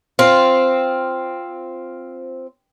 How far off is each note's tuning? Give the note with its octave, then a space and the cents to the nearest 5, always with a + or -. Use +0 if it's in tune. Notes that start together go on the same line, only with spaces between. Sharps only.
C4 +0 F4 +0